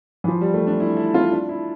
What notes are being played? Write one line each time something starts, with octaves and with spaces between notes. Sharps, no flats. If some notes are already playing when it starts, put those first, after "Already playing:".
E3
F3
G3
A3
D4
E4
E4
F4
D4
E4